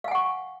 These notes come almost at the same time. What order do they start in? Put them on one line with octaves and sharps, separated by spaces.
F5 G#5 F#5 C#6